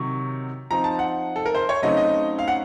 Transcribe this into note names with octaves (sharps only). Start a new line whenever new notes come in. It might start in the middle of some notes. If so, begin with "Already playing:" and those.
Already playing: C3 D#3 F#3 C#6
F3 C4 D#4 A#5
A5
F#5
A4
A#4
C5
C#5
C#3 F#3 A3 C4 D#4 D#5
D#5
F5
F#5